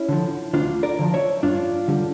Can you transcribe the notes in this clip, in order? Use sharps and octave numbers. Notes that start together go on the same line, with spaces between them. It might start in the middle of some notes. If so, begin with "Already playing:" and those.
Already playing: C#4 E4
D3 F3
D2 D4 F4
A#4 D5
D3 F3
C#5 E5
G2 D4 F4
D3 G3